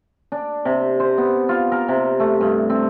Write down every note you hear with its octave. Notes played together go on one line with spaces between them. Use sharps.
D4
C3
C5
B3
F4
A#4
C3
A3
G2
C4